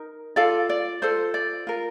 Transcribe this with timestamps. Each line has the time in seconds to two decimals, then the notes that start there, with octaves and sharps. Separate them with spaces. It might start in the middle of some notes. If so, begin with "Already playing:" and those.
Already playing: D#4 A#4
0.36 F4 A4 D5 F5
0.69 D5
1.02 F4 A4 C5
1.34 D5
1.67 F4 A#4